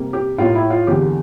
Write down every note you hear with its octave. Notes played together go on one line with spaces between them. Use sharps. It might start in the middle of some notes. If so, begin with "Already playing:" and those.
Already playing: C3 G3 A#3
G4
A2 G3 A#3 F4
E4
F4
E2 D3 G3 A#3 G4